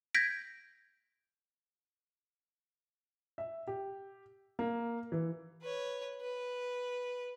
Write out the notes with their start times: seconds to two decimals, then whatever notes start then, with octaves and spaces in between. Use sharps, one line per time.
0.14 G6 G#6 A#6 B6 D7
3.38 E5
3.67 G4
4.59 A#3
5.12 E3
5.62 B4 C#5
6.21 B4